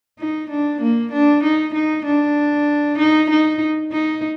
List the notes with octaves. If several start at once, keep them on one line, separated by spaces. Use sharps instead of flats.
D#4
D4
A#3
D4
D#4
D#4
D4
D#4
D#4
D#4